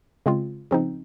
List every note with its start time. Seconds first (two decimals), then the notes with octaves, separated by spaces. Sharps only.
0.26 C#3 G#3 C4 F4
0.71 C#3 F3 C4 D#4